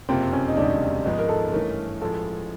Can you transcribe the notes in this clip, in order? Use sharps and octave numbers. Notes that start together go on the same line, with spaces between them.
F#1 F2 C3 F3 A#3 C4
C#4
D#4
E1 D2 C3 D#3 G3 D4
G#1 G#2 F3 G#3 B3 D#4
A#4
A4
G2 E3 A3 C#4 A#4
A1 A2 F3 G#3 A4